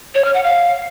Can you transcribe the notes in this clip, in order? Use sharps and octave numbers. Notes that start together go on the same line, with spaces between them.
C#5
F6
F#5
F5